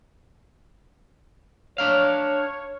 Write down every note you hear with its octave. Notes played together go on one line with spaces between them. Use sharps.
D4 A#4 C#5 F5